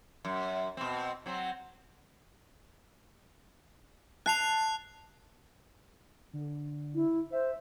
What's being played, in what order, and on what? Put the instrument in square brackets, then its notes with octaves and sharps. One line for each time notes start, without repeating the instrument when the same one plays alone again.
[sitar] F#2
B2 C4
F#3 C4
[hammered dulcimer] A5 [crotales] F#6 C7 F7
[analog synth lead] D3
[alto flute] E4
[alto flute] C5 [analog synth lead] E5